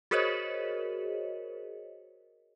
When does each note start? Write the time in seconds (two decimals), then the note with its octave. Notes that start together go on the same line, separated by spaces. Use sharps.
0.11 F#4 G#4 A#4 C5 C#5 D#5